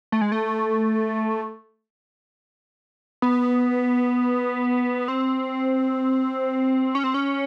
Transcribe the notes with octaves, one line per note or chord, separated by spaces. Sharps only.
A3
G#3
A3
B3
C4
C#4
C4
C#4